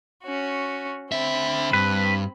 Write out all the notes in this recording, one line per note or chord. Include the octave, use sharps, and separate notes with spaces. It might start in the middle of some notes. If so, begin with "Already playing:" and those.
C#4 F#4
D3 C4 E5 B5
G2 B4